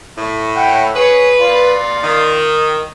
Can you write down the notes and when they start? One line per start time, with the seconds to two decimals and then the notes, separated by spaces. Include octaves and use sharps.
0.18 A2
0.56 E4 F#5 G5
0.95 G#4 B4 C#5
1.41 F4 D5 F5
2.03 D#3